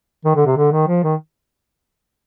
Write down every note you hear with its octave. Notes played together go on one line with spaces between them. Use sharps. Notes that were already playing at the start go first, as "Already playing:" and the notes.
D#3
D3
C3
D3
D#3
F3
D#3